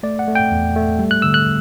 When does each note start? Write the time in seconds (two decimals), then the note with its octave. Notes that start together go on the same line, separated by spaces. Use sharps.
0.03 A3 D5
0.19 F#5
0.28 A3
0.35 G5
0.51 E2
0.76 A3
0.99 G3
1.11 F#6
1.22 D3 E6
1.34 F#6